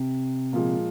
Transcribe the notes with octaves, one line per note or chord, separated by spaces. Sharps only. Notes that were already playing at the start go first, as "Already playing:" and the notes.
Already playing: C3
A#2 F3 G#3